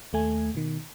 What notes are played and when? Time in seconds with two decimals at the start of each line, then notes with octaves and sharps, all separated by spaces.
0.13 D#2 A3 G#5
0.55 B2 D#3